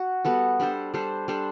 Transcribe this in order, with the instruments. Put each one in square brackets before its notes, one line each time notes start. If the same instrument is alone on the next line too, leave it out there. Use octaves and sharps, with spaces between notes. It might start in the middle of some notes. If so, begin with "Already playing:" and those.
Already playing: [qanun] F#4
G3 B3 F#4 A4
G3 D4 A4 C5
G3 D4 A4 C5
G3 D4 A4 C5